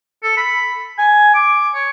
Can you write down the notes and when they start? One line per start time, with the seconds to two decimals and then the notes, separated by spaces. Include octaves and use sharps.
0.24 A4
0.37 B5
0.98 G#5
1.34 D6
1.75 C#5